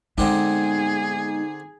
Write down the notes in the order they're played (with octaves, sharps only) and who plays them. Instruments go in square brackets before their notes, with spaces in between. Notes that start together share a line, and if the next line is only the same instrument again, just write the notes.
[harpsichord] D3 C4 D4 [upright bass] G#3 B3 [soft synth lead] D#4 [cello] G#4